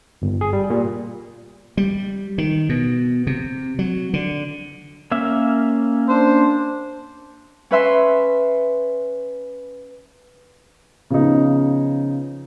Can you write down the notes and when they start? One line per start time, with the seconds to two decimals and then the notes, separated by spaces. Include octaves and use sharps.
0.22 G1
0.41 G#4
0.53 G3
0.70 A#2
1.77 G3
2.38 D#3
2.69 B2
3.27 C3
3.79 F#3
4.13 D3
5.11 A#3 C#4 E5
6.09 D4 C5
7.71 C#4 B4 E5 C6
11.10 C#3 F3 B3 D#4